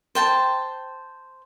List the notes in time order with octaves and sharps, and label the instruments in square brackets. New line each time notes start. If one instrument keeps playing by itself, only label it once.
[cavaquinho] C5 G5 A5